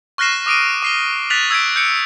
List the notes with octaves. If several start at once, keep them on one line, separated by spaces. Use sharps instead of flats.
C#6 F6 F#6 A#6 C7 E7
D6 D#6 D7 D#7
D6 C7 G7
F#6 A6 B6 F7 F#7
E6 G#6 B6 D7
G6 C#7 D7